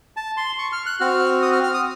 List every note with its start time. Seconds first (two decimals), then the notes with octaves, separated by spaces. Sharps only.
0.17 A5
0.37 C6
0.58 C#6
0.72 F6
0.86 F#6
1.00 C4 F#4 F6
1.42 D#6
1.53 F6
1.64 F6
1.74 D#6